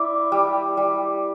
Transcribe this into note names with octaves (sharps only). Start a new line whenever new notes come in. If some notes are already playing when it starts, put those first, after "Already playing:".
Already playing: E4 D5
G3
G3